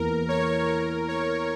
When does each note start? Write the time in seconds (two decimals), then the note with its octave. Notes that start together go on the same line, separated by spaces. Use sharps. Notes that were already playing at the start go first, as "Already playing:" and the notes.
Already playing: E2 E3 A#3 A#4
0.29 C#5
0.68 A#4
1.08 C#5